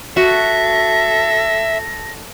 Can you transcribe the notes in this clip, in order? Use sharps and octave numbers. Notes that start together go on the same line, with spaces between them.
F#4 A4 E5 A#6